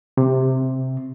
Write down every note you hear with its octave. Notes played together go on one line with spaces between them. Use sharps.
C3